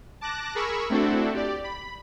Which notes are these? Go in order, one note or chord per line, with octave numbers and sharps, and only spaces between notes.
A5 D6 F#6 A#6
G#4 A#4 B5 C#6 E6
A3 C4 D4 E4 F#4 A4
G4 D5
B5